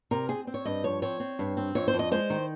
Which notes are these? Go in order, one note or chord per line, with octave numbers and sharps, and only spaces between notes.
C3 A#4
C4 G#4
C4
C#5
G2 D#5
F3 C#5
C4 C#5
C4
G2
C4
F2 C#5
C5
F2
D#5
G#3 C5
D#3